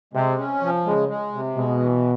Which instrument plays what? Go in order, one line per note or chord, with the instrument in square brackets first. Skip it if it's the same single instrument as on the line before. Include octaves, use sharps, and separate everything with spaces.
[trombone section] C3 [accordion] G#3
[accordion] C#4
F3
[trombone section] C#3 [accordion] G#3
[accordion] G#3
C3
[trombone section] B2 [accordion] G#3
[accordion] E3